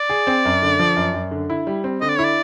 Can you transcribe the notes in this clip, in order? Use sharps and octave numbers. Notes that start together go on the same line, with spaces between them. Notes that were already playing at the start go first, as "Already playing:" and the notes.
Already playing: D5
G#4
C4
F#2
D3
F3
F#2
F#2
D3
E4
G3
C4
D3 D#5
D5
E4 C#5
D5